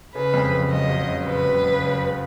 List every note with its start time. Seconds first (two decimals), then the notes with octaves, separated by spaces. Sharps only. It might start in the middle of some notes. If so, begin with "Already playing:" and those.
0.15 C#3 B4
0.34 F2
0.52 F#1
0.70 F#1 D#5
0.89 F#1
1.08 F#1
1.26 F#1 B4
1.44 F#1
1.63 F#1
1.82 F#1
1.99 F#1